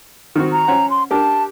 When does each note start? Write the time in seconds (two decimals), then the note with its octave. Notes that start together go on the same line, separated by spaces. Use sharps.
0.36 D#3 C4 F#4
0.52 A#5
0.68 C#4 C5 F#5
0.90 C6
1.11 D4 G4 A#4 A5